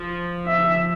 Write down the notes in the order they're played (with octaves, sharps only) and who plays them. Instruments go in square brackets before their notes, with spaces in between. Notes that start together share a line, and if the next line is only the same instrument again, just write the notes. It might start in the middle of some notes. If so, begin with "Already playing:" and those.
Already playing: [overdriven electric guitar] F3
[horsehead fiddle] E5